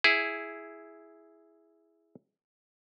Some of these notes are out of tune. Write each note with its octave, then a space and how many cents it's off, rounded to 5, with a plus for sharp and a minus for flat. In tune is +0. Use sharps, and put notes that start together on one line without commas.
E4 +0 G#4 +0